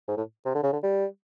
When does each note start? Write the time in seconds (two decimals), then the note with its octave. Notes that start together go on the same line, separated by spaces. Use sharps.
0.08 G#2
0.17 A2
0.46 C3
0.55 D3
0.63 C#3
0.73 D3
0.83 G3